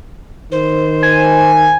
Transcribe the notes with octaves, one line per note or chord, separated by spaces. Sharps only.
D#3 C5
G#5